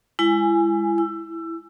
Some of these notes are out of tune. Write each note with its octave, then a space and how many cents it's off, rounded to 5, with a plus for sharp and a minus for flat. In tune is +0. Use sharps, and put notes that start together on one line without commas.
G#3 -15 E4 +30 G#5 +0
E4 +0 E6 +25